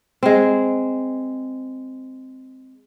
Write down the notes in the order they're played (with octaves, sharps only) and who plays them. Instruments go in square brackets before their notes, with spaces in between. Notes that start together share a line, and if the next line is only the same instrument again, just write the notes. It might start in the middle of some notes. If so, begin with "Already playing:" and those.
[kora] G#3 C4